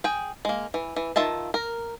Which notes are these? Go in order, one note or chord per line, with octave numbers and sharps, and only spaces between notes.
G#4 G5
G#3 A#3
E3
E3
D#3 F4 E5 A5
A#4